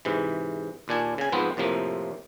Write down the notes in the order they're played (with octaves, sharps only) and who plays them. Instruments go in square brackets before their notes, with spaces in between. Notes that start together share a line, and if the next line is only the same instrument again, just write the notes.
[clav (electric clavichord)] G#2 C3 E3
D#2 A#2 D4 G#5
C#3 G#5
G#2 F3 B3 C4
F2 A2 C3 F3 A#3